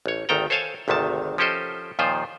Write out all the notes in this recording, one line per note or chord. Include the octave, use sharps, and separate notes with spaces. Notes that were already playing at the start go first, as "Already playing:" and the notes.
A1 C#5
G#1 D2 D#3 A4 G5 A#5
A4 C5 C#5 F5 G#5 A5
G#1 D2 C3 D#3 A5
F3 C#4 G4 A4 C5 D#5
D#2 A#2 D#3 F3 F4 C5